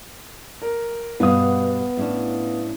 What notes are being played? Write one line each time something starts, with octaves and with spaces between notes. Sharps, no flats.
A#4
G2 B2 B3 F5 D#6
A2 C#4 D4